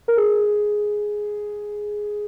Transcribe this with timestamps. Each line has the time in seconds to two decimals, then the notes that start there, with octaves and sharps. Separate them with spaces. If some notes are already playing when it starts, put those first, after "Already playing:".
0.08 A#4
0.17 G#4